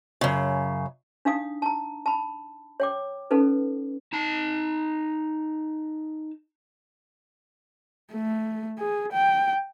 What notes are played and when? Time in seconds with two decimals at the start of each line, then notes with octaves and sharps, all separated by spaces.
0.21 F#2 C#3
1.25 D4 D#4 F5 D#6
1.62 A5 A#5
2.06 A5 B5
2.80 C#5 G5 D6
3.31 C#4 D#4 A4 B4
4.13 D#4 A5
8.13 A3
8.78 G#4
9.13 G5